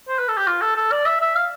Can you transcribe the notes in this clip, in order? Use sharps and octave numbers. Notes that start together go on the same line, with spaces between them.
C5
B4
A4
G4
F4
A4
A4
D5
E5
E5
F5